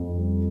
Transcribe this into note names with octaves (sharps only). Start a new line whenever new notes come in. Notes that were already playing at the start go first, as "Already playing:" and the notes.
Already playing: F2
G3